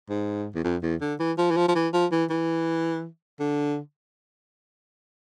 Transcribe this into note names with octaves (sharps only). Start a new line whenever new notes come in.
G#2
E2
F2
E2
D3
E3
F3
E3
F3
F3
E3
F3
E3
E3
D3